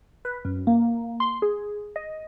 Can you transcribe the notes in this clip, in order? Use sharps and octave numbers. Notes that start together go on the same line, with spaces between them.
B4
F#2
A#3
C6
G#4
D#5